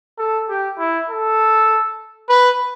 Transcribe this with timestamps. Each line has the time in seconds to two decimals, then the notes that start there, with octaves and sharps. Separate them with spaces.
0.18 A4
0.50 G4
0.78 E4
1.10 A4
2.29 B4